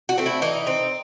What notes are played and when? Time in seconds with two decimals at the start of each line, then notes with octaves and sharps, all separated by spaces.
0.09 F#4
0.18 A3 C4
0.26 E4
0.42 E3 D#4
0.67 C4